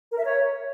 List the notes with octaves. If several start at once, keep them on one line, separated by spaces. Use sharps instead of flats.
A#4
E5
C#5